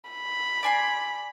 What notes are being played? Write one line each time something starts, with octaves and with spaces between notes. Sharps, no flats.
B5
D5 G#5 C6